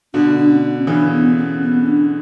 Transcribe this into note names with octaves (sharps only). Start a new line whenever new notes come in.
B2 D3 D4
D4
C#4
C#3 E3 D4
B3
C#4
B3
C#4
D4